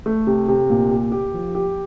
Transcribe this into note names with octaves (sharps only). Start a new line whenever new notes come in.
A3
C3
C3
A#2
G4
G4
F3
G4